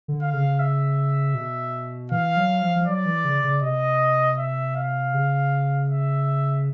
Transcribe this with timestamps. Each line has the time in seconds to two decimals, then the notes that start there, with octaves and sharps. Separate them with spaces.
0.08 D3
0.22 F5
0.34 C#3
0.59 E5
1.35 B2
2.11 E3 F5
2.37 F#3
2.62 F3
2.76 F3
2.87 F#3 D5
3.06 E3
3.25 C#3
3.44 C#3
3.62 C3 D#5
4.38 E5
4.76 F5
5.14 C#3
5.90 E5